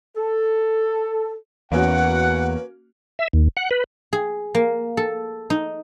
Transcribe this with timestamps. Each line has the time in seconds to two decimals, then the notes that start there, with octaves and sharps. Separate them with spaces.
0.17 A4
1.72 E2 A#3 C#4 F#4 B4 F#5
3.19 E5
3.33 D#2
3.57 F#5
3.71 B4
4.13 G#4
4.55 A#3
4.97 A4
5.50 D#4